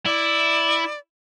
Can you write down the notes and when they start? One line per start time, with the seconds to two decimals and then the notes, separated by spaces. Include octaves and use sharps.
0.06 E4 D5